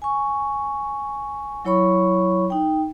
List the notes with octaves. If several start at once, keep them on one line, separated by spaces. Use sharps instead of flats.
G#5 C#6
F#3 E4 C#5 B5 C#6
D#4 G5